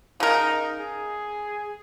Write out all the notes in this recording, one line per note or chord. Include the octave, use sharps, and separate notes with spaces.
C#3 D#4 A#4
G#4